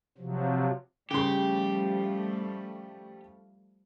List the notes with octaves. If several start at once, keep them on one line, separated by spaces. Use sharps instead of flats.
C3 F3 F#3
C#3 F3 G3 A3 G4 C6